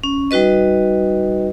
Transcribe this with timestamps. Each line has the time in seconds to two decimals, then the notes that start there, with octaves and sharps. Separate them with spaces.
0.04 C#4
0.31 G3 D#4 F#4 B4 D#5